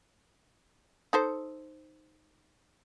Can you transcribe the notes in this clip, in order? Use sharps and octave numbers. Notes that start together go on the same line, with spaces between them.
D#4 A4 C5